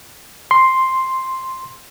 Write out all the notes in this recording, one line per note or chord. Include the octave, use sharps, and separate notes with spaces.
C6